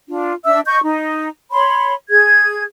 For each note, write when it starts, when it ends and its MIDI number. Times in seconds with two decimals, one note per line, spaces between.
0.08 0.32 62
0.08 0.32 65
0.45 0.60 62
0.45 0.60 76
0.45 0.60 88
0.65 0.78 75
0.65 0.78 85
0.65 0.78 91
0.83 1.28 63
1.51 1.93 73
1.51 1.93 83
1.51 1.93 84
2.09 2.63 68
2.09 2.63 92